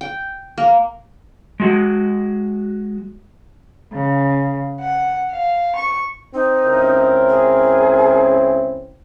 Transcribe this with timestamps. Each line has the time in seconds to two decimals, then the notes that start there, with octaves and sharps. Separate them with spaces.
0.01 G5
0.58 A#3
1.60 G#3 F#4
3.93 C#3
4.80 F#5
5.31 F5
5.76 C#6
6.34 C4 D#4
6.64 C#2 C#4 E4 A#4
7.29 G#4